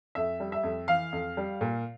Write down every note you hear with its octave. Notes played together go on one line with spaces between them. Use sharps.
F2 E5
G3
E5
F2
E3 F5
F2
G3
A#2